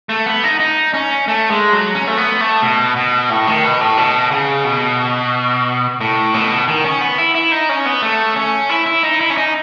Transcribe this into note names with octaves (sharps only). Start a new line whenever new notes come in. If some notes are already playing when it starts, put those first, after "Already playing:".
A3
B3
D#4
D#4
C#4
A3
G#3
F#3
C#4
A3
B3
A3
B2
B2
A2
D#3
B2
A2
B2
C#3
B2
A2
B2
D#3
C#4
B3
E4
E4
D#4
C#4
B3
A3
C#4
E4
E4
D#4
E4
C#4
D#4